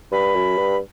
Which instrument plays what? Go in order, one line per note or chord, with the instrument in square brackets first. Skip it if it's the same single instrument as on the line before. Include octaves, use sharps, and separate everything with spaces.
[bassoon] G2 [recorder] B5
[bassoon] F#2
G2